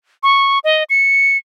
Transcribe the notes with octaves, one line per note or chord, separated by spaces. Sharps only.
C#6
D#5
C#7